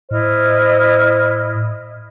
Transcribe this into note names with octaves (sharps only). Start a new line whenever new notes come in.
A2 E4 C5 D#5 F6